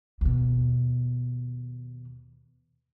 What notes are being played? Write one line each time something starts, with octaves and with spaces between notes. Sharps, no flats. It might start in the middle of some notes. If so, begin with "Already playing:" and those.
D#2 B2